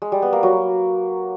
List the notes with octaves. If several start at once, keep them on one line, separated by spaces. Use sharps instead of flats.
G#3
G3
B3
A#3
F#3